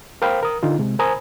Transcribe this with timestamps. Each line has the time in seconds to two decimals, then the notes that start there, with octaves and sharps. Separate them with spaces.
0.22 A#4 C5 F5 G5 B5
0.43 A#4 D#6
0.63 D3 D#4 F4
0.79 C3 G#3
0.99 A#4 C5 G#5 A#5 B5 D#6